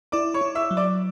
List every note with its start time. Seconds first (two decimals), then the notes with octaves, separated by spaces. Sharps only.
0.12 E4 D5 D6
0.34 C#5 C#6
0.41 E4
0.55 E5 E6
0.71 F#3
0.77 D5 D6